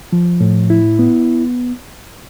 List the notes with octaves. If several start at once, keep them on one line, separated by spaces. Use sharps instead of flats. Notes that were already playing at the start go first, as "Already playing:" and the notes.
F3
A2
E4
B3